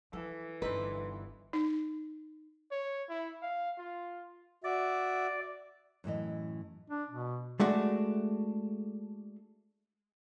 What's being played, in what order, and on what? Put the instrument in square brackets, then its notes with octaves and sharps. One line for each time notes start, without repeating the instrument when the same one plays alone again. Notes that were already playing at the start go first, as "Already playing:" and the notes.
[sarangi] E3 [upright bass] F3 [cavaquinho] A4
[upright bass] G1 D3 [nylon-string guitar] D4 B4 [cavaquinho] D#4 A4 C5
[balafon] D#4
[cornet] C#5
E4
F5
F4
[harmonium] F#4 E5 [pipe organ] D5
[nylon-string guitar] F#2 A2 E3 D#5
[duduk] D4
B2
[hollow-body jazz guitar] G#3 A3 D4 F#4